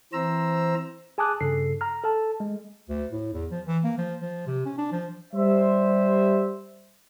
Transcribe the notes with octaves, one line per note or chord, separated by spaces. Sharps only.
E3 C4 C5 A#5 E6
G#4 G#5 A5 D6 D#6 F#6
G2 C#3 A4 C7
A#5 F6
A4 A5
G#3
D2
A2
E2
F3
E3
A#3
F3
F3
C3
C#4
D4
F3
G3 C5 E5